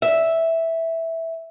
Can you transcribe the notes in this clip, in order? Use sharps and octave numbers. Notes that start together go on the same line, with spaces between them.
E5